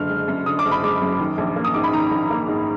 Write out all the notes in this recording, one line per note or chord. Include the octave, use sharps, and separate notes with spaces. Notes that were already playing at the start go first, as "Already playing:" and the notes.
Already playing: F#1 D3 F6
G#3
F#2
D3 D#6
D6
F#1
B5
G#3 D6
F#2
D#3
A#1
A#3
D#6
G#2 D6
B5
D#3 A#5
A#1
A#3
G#2